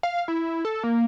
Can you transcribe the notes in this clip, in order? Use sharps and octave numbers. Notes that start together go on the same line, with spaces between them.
F5
E4
A4
A#3